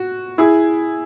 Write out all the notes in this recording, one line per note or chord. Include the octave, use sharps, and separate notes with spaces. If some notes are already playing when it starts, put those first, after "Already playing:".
Already playing: F#4
E4 G#4